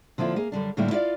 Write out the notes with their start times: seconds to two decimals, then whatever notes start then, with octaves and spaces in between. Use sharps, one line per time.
0.18 D3 F3 A#3 E4 F4
0.36 A#3 G#4
0.52 F#2 D3 G3 D4
0.77 A2 D3 G3 A#3 D4 E4
0.91 E4 F4 D5 E5 F5